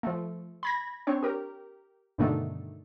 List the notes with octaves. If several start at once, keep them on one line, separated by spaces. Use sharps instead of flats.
F3 A3
B5 G#6 A#6
C4 D4 C#5
G4 A#4
G2 B2 D3 D#3 A3